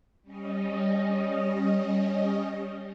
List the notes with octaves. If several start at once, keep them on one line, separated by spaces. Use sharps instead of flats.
G3 C#4 D#5